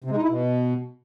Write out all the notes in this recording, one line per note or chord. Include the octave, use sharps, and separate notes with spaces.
C3
G#3
D#4
E4
B2